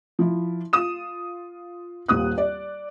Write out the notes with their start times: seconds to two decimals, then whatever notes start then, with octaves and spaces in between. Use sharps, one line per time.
0.19 F3 E4
0.73 F4 D#6 E7
2.08 D#1 D#2 D#6 F#6
2.38 D5